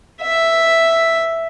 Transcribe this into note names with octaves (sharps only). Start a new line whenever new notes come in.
E5